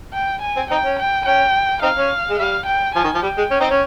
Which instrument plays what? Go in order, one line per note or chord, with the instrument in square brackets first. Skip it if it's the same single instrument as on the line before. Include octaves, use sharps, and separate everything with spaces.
[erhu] G5
G#5
[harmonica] C4
[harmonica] C4 D#4 [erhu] G5
[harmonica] C#4
[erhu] G5
[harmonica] C#4 [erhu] G5
[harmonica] C4 D#4 [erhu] F5
[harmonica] C#4
G#3
[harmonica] G3 [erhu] F5
[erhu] G5
[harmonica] F3 [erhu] G#5
[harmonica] D#3
F3
[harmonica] G3 [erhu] G5
[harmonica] G#3
C#4
C4 D#4
C#4